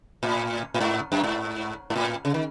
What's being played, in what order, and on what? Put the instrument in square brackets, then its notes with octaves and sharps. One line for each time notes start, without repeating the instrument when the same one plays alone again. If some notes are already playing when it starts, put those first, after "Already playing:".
[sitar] A2
A2
G#2
F#2
G#2
G#2
A2
C#3
D#3